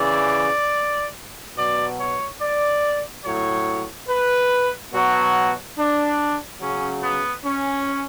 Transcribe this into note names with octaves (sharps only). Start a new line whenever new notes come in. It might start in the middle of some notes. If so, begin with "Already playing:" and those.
Already playing: C#3 E3 D5
B2 F#3 D5
C#5
D5
A2 F#3 C#5
B4
B2 F#3 F#4
D4
C#3 F#3 C#4
B3
C#4